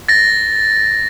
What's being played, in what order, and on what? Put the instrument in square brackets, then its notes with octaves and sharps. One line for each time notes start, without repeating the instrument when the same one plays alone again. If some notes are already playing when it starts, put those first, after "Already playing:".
[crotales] A6 A#6